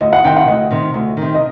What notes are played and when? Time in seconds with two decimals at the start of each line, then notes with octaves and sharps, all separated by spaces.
0.01 D2 D#5
0.13 F#5
0.24 C3 D#3 G5
0.36 F#5
0.48 D2 D#5
0.71 C3 D#3
0.94 D2
1.17 C3 D#3
1.34 D#5